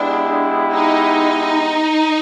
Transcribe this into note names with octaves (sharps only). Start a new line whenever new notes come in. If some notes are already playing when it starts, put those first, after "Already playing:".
Already playing: G#3 B3 D4 E4 G4
D#4